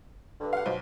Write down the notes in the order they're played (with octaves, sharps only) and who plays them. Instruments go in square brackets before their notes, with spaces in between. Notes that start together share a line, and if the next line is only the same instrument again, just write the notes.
[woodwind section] G2 D3
[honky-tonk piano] F5 F#5
[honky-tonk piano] B1 [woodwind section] B2 F3